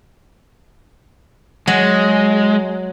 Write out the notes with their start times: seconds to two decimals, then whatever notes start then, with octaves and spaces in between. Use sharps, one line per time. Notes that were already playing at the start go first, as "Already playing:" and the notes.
1.67 F#3 G#3